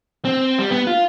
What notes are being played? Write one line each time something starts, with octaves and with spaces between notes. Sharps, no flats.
C4
G3
B3
F4